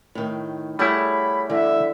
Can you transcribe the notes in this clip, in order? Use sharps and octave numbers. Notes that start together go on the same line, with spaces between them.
A2 D#3
G3 A3 E4 G#4 C#5 F#5 B5
D3 E3 E5